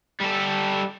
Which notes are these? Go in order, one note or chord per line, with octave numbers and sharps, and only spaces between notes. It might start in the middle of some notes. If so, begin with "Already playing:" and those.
G3 A4